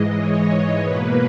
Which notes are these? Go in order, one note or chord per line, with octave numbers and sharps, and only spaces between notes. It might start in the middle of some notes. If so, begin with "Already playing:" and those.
Already playing: G#2 E3 G#3 D#5
C#5
B2 A#3 B4